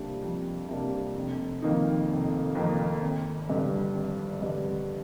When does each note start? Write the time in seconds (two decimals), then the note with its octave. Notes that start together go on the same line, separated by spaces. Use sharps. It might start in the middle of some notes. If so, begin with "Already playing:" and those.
Already playing: F2 C3 G3 A#3 D4
0.23 F2
0.69 C3 G3 A#3 D4
1.16 F1
1.62 F2 D#3 A#3 D#4
2.09 F1
2.55 F2 D#3 A#3 D#4
3.02 G#1
3.50 G2 D3 G3
3.95 G#1
4.42 G2 D3 G3